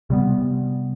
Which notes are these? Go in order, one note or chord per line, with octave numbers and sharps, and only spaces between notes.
C3 G3 B3